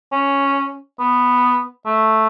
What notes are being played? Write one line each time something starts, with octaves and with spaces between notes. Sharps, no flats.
C#4
B3
A3